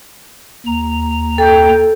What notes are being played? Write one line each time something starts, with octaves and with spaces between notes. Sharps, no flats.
D#2 A#5
A4 G5